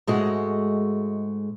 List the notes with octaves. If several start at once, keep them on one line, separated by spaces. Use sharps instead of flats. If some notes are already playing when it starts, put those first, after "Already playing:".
G#2 G#3 A3 F#4